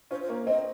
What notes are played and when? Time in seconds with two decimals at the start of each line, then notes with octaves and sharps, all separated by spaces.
0.11 C#4 F4 C5
0.22 C5
0.29 A#3 C#4
0.47 C4 D#5